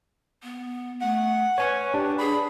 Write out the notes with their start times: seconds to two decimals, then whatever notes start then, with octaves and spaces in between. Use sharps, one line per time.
0.43 B3
1.01 A3 F#5
1.58 B4 C#5 G#5 C#6
1.94 D4 G4
2.18 G#4 B5